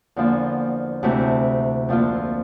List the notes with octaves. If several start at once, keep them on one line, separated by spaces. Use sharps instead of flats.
E2 D3 F3 A#3 F4
D2 C3 E3 A3
F2 D3 F3 A#3 F4